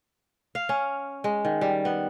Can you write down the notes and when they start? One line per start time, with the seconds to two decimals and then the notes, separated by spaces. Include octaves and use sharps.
0.55 F5
0.69 C#4
1.24 G#3
1.45 D#3
1.61 G3
1.85 B3